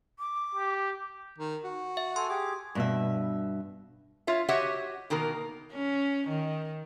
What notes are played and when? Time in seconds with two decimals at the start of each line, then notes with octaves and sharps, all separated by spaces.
0.19 D6
0.55 G4
1.38 D#3
1.64 F#4
1.97 E5
2.16 A4 G#5 C6
2.29 G4 G#4 D6
2.75 G2 B2 E5
4.27 F4 C#5 E5
4.48 F#4 G4 C#5 D#5 E5 F#5
5.10 B2 D#3 A#3 A#4
5.73 C#4
6.27 D#3